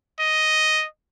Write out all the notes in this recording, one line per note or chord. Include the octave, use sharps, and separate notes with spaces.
D#5